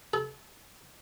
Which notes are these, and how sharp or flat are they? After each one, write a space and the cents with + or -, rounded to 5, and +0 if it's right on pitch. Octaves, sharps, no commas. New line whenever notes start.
A4 -35